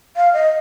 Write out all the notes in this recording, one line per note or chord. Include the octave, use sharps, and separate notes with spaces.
F5
D#5